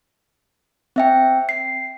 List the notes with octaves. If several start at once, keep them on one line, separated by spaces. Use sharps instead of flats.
C4 E5 G5
C7